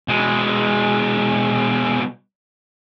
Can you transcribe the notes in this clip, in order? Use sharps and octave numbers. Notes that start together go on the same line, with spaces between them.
B2 G#3